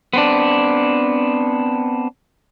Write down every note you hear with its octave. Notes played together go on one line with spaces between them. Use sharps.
B3 C4 D4